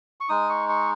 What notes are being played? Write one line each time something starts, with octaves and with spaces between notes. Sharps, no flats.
C#6
G#3 D#4 D#6
C#6
C#6